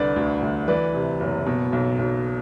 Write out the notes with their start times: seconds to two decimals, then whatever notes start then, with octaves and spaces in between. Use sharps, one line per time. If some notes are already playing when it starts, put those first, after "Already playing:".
Already playing: C2 D3 B4 D5
0.16 D2
0.42 D2
0.68 E3 B4 D5
0.94 C3
1.20 F#1
1.46 B2
1.73 B1
1.99 B1